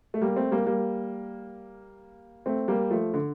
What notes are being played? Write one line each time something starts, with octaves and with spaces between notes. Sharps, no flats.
A3
G3 A#3
A3 C4
G3 A#3
G3 A#3
A3 C4
G3 A#3
F3 A3
D3